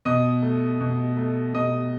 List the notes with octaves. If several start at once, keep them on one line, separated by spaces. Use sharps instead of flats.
B2 D#5 D#6
A3
B2
A3
B2 D#5 D#6